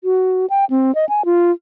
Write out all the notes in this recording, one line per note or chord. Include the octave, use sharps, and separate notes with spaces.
F#4
G5
C4
D#5
G#5
F4